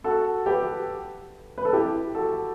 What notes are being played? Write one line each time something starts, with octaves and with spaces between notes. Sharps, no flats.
F#4 A4
G4 B4
B4
A4
E4 G4
F#4 A4